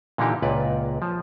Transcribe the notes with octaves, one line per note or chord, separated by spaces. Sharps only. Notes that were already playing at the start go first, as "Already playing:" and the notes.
A#2 D3 E3 A#3 D#4 G4
C#2 A#2 B4 D5
F3